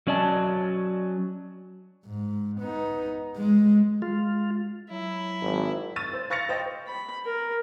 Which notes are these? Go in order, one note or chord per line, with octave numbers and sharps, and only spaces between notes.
F#3 C#4 D5 D#5 A5
G#2
B3 D#4
G#3
G#3 F4
F#3 E4
G#1
C#6 E6 A6 D#7
C5
F5 C#6 A6 A#6 C#7 F7
C5 D#5 G5
B5
A#4